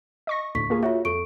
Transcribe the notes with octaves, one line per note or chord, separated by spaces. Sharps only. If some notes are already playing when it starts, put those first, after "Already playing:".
D#5 C#6 A#6
D2 A2 C#6 B6
A#3 F4 G#4
F4 F#4 C#5 E5
F2 A4 C#6 D7